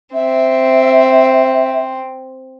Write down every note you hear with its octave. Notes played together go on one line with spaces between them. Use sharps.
C4 E5